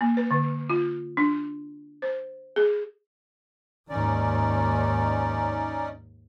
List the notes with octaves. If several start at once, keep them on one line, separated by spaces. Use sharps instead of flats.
A#3
B4
D3
F4
D4
C5
G#4
D#2 G#2 C#4 D#4 D5